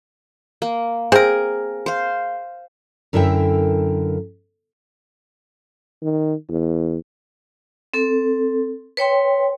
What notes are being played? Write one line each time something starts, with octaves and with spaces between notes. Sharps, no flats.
A#3
C4 G#4 A#4
C5 F5
F#2 D3 E4 A#4 E5 G5
D#3
E2
C4 A4
B4 C#5 G5 C6